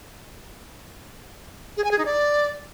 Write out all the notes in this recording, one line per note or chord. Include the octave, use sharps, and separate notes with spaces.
G#4
G#5
G#4
D#4
D5